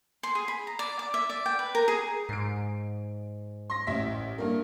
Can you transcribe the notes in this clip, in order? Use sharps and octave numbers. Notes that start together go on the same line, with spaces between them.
C6
G#4
B5
A#5
D5
D6
E5
D5
G5
B4
A#4
G#4
G#2 C7 D7
C6 A#6
A1 E5 B6
G2 A#3